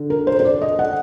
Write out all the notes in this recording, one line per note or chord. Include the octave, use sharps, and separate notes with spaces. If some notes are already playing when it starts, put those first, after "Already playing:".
Already playing: D3
A#4
C5
C5
D5
D#5
F#5